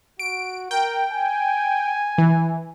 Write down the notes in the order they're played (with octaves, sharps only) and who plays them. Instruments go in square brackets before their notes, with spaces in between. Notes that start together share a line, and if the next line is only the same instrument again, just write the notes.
[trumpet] F#4 [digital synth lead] D7
[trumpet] A#4 [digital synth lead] G5
[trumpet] G#5
[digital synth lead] E3